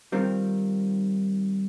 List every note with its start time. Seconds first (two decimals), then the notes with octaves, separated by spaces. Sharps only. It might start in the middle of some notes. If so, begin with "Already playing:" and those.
0.12 D#3 G3 C4 F4 A#4